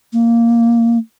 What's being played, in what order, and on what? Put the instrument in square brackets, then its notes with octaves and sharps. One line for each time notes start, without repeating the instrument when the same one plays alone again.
[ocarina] A#3